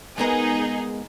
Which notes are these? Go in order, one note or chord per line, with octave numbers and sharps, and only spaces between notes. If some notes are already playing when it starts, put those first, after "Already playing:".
G#3 B3 D#4 G#4 A#4